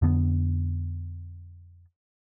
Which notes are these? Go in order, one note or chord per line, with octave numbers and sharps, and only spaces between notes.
F2 D3 B3